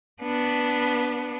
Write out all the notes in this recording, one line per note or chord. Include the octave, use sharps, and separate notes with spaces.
B3 D4